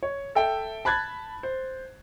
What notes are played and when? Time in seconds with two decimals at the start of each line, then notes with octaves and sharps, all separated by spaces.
0.03 C#5
0.35 A4 E5 G5
0.85 A5 B5 F#6 G#6 A6
1.43 C5